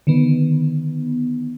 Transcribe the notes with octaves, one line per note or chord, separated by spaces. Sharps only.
D3 D#3 B3